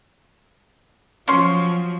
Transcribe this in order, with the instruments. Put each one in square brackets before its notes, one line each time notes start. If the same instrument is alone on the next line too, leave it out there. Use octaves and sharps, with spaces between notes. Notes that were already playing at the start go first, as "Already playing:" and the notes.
[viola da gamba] F3 F#3 [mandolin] C#4 C6